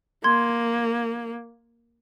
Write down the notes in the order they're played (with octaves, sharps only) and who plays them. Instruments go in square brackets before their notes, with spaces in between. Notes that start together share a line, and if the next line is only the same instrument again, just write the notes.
[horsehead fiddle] A#3 [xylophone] C6 G#6